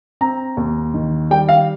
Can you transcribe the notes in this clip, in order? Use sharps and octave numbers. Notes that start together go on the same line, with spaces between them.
C4 A#5
D#2
D#3
G3 G5
F5